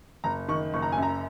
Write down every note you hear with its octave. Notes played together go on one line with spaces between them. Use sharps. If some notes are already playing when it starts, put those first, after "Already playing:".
F#1 A#5
D#3 C#6
F#1 C#6
A#5
F#2 G#5
A#5